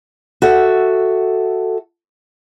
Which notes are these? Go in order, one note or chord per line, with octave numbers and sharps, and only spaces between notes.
F#4 A4 E5